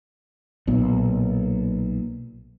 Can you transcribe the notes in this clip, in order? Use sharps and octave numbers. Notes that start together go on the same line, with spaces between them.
B1 A#2 B3